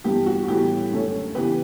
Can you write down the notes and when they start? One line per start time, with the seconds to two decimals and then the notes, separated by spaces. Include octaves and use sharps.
0.04 G2 E3 B3 G4
0.26 F#4
0.44 F#4
0.48 A2 E3 G3 B3 G4
0.91 F#2 D3 A3 C#4
1.35 C#3 E3 B3 G4 B4